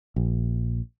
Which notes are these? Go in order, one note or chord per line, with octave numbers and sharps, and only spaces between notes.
A#1